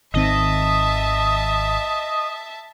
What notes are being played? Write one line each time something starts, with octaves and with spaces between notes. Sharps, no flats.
G#1 D#3 C4 D#5 E5 A5